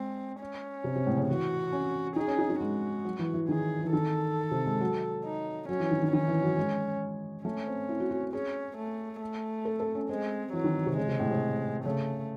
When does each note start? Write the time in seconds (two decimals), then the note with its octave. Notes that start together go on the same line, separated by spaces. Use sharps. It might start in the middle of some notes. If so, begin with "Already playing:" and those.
Already playing: G#3 C4
0.41 C#4
0.84 C3
0.96 C3
1.06 A2
1.17 C#3
1.28 E3 F#4
1.72 C#4
2.16 D#4 G#4
2.27 C#4
2.39 D#4
2.50 D#4
2.60 G#3 F#4
3.05 F#3
3.19 E3
3.34 E3
3.49 D#3 G#4
3.83 E3
3.93 D#3 A4
4.51 C3
4.66 G#3
4.81 F#3
5.25 D#4
5.69 F#3 C#4
5.80 E3
5.91 D#3
6.02 D#3
6.13 D#3 C#4
6.28 E3
6.42 F#3
6.57 G#3
7.45 A3 C#4
7.67 C4
7.89 E4
8.00 F#4
8.11 F#4
8.33 C#4 G#4
8.77 A3
9.21 A3
9.65 A4
9.80 A4
9.95 C#4
10.09 G#3 C4
10.53 E3 F#3
10.64 D#3
10.86 C3
10.97 C#3 G#3
11.08 C3
11.19 A2
11.31 C3
11.85 C#3 A3